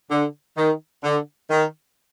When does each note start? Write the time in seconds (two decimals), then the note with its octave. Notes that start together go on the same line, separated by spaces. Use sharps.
0.11 D3
0.57 D#3
1.04 D3
1.50 D#3